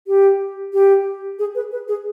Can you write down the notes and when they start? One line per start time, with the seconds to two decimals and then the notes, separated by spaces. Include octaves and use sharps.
0.07 G4
0.73 G4
1.39 G#4
1.55 B4
1.72 B4
1.88 G#4